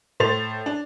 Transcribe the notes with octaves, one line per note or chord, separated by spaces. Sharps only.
A2 C5 A6 F7
D4